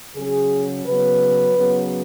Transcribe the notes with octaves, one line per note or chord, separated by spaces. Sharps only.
C#3 F#3 C#4 G#4
C#3 F#3 B3 B4
C#3 F#3 B3